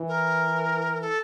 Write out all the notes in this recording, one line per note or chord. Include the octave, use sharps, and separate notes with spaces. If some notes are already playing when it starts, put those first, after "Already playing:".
Already playing: E3
A#4
A4